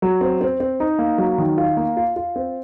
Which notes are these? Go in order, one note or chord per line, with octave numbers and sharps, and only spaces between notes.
F#3
C4
C4
C4
D#4
A#3
F#3
D#3
F4
A#3
F4
F4
C4